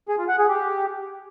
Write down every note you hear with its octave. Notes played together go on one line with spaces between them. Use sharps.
G#4
F4
F#5
G#4
G4